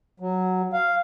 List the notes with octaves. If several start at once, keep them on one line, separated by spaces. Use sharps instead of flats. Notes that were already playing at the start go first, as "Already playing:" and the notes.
F#3
F5